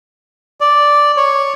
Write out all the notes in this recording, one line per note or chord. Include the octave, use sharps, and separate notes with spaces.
D5
C#5